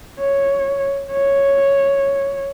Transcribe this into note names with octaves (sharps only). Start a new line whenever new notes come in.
C#5
C#5